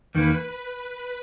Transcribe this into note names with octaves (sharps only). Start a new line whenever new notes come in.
E2 D#3 A#3 B4